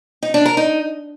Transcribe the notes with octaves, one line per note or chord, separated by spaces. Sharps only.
D#4
D4
A#4
D#4